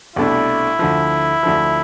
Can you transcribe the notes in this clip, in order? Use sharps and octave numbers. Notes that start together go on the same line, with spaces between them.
C2 B2 A3 D4 E4
D2 D3 F3
D2 D3 F3